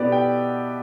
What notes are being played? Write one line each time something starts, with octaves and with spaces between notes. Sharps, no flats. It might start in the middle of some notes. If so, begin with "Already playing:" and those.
Already playing: B2 B3 E4 G4 A4 B4 D5
G5